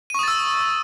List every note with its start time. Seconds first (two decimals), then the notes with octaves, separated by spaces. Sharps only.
0.10 D#7
0.14 C#6
0.19 D#6
0.23 A6
0.28 E6